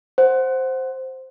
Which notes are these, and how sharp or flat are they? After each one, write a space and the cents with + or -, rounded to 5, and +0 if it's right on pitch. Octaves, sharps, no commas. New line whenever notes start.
C5 +0 F#5 -5